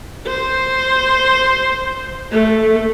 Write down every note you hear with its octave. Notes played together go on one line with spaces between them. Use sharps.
C5
A3